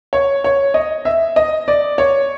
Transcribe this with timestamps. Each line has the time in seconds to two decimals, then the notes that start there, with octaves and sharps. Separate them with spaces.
0.13 C#5
0.44 C#5
0.74 D#5
1.05 E5
1.36 D#5
1.68 D5
1.98 C#5